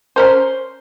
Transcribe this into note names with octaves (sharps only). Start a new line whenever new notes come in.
C#4 A#4 C5